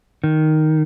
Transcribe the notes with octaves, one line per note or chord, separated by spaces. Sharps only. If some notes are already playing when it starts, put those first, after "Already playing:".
D#3